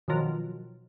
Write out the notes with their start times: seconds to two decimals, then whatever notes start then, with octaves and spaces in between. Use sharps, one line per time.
0.08 B2 D#3 F3 F#3 F4 A#4